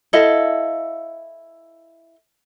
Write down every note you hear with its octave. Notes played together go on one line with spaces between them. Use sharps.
E4 A4 D#5 F5